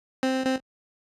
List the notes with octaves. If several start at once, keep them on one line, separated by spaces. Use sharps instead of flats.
C4
C4